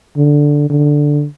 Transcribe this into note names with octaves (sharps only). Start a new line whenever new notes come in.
D3
D3